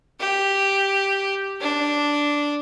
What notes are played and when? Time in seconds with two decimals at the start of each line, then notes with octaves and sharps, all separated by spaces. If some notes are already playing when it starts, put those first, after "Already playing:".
0.20 G4
1.61 D4